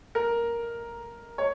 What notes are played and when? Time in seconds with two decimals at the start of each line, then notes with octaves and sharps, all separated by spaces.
0.15 A#4
1.38 C#5